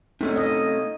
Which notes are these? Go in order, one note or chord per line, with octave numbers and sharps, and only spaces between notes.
C3 A3 C#4 D#4
D#5